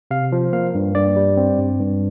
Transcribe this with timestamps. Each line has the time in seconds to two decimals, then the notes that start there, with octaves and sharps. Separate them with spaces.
0.11 C3 F5
0.32 F3
0.53 A#3 F5
0.75 G2
0.95 G2 D5
1.16 G3
1.37 C4
1.58 G2
1.80 G2